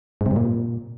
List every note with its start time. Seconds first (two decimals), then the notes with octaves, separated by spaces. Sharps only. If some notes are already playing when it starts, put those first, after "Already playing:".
0.21 G#2
0.26 C3
0.31 G2
0.36 A#2